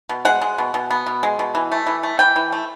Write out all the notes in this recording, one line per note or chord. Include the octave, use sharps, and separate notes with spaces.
B2
G#3 F#5
G#3
B2
B2
B3
B2
G#3
B2
E3
A3
E3
A3
E3 G5
E3
A3